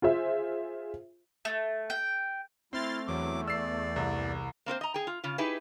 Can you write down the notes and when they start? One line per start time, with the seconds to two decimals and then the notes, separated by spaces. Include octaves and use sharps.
0.02 F4 G#4 C5 E5
1.45 A3
1.90 G5
2.73 A3 C4 E4 C6 F6 A6
3.07 E2 F#3 D6
3.47 D5 E6 C7
3.96 C2
4.66 A#3 C4 A#4 C5
4.81 D#5 A#5
4.94 G#4 G5
5.07 F4
5.24 C#3 F4
5.38 D#4 E4 G4 G#4 B4